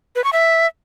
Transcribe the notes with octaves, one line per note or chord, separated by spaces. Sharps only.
B4
C#6
E5